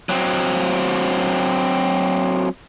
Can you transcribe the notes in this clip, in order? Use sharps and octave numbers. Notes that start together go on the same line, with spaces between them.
F#3 C4